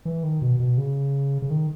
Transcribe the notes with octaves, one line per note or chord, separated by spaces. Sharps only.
E3
D#3
B2
B2
C#3
C#3
D#3